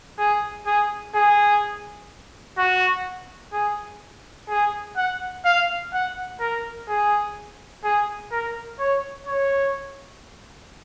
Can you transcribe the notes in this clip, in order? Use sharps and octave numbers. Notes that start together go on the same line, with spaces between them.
G#4
G#4
G#4
F#4
G#4
G#4
F#5
F5
F#5
A#4
G#4
G#4
A#4
C#5
C#5